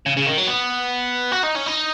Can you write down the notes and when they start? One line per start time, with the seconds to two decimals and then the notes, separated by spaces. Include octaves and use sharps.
0.06 C#3
0.17 C#3
0.26 D#3
0.38 F#3
0.48 B3
1.32 F#4
1.43 D#4
1.55 C#4
1.66 D#4